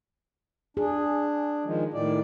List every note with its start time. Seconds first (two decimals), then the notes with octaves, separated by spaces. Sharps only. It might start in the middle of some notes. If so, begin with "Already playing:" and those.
0.77 D4 G#4
1.65 D#3 F3 G#3
1.94 A2 D#3 D5